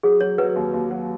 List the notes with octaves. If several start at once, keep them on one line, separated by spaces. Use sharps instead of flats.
F#3 G#4
F#3 C#5
F#3 B4
D#2
D#2
F#3